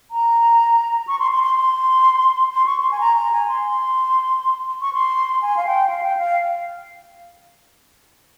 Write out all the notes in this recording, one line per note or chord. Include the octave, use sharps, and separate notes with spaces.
A#5
C#6
C6
C6
C6
C6
C6
C#6
C6
G#5
A#5
A#5
G#5
C6
C#6
C6
G#5
F5
G5
F5
G5
F5